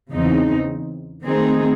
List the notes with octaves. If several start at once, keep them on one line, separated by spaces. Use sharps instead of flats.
E2 C#3 E3 C4 D#4
D#3 A3 C4 D#4 G#4